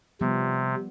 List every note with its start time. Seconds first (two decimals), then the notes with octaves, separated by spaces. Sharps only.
0.21 C3 F3 G3 B3